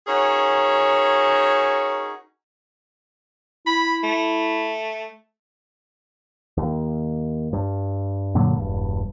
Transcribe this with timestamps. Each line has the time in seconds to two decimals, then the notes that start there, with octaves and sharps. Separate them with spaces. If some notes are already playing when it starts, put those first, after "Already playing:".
0.07 C#4 D#4 F#4 G#4 A#4 C#5
3.66 E4 B5
4.03 A3
6.57 D#2
7.53 G2
8.35 F#2 A#2 D3 F#3
8.55 E1 G2